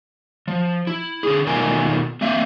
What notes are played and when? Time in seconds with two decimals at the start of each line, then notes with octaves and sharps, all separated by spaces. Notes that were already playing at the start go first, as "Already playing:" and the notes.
0.48 F3
0.87 E4
1.23 D3 G#4
1.47 B2 D#3 A3 F4 A#4 G#5
2.21 A#3 C4 E5 F5